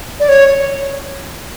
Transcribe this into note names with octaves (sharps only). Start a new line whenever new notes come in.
D5
C#5